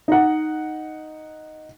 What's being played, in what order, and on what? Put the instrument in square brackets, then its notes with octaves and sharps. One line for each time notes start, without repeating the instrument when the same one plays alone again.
[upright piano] D#4 F#5